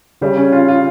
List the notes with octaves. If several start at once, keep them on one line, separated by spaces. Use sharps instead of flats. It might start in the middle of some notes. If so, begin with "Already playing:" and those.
C#3 G3
C#4
F4
F4